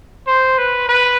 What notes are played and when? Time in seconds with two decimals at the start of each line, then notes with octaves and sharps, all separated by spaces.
0.27 C5
0.58 B4
0.89 B4